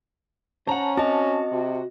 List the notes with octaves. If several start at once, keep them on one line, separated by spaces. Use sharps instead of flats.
C#4 C5 F#5 A5 A#5
C4 F#4 D#5 A5
C3